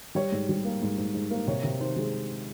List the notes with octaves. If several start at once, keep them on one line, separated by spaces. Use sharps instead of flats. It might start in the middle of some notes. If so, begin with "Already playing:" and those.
G3 C#5
G#2
G3
A#3
G#2
G#2
G#2
A#3
C3 C#5
C3
D#3 C5
G#3